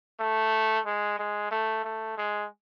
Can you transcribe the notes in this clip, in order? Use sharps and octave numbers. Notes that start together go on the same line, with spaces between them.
A3
G#3
G#3
A3
A3
G#3